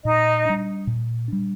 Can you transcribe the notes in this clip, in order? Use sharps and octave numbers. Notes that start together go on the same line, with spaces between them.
A#2 D#4 D#5
G3 D4
A#2
G3 D4